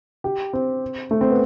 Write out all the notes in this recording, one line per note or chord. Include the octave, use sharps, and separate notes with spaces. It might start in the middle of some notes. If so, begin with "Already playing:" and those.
G4
C4
A3
C4
B3